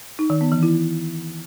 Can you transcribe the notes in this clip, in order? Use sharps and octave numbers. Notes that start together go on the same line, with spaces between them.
D#4
D#3
B3
E3
E4